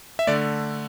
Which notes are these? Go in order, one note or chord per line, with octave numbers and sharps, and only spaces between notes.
E5
D3 A3 D5